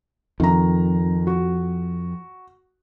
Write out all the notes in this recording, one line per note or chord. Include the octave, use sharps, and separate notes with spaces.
F2 D#3 A#5
F#4